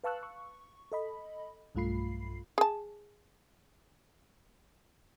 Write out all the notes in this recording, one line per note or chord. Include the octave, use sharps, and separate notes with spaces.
B4 F5 A5 C#6 E6 F#6
C#6
A4 D#5 B5
B1 G2 A3 F4 B5 C7
G#4 A5